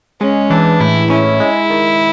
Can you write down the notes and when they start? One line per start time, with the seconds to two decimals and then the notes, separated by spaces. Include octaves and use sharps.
0.21 G#3 C#4
0.50 E3 D4
0.80 A2 E4
1.10 C#4 E4
1.40 G#3
1.70 D#3